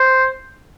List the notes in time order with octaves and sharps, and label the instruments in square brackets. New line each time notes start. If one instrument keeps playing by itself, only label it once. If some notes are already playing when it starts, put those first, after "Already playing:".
Already playing: [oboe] C5